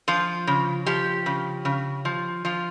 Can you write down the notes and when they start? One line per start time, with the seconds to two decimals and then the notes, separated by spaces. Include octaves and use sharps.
0.08 F3 F4
0.47 C#3
0.86 F3 G4
1.26 C#3
1.65 C#3
2.05 F3
2.45 F3 F4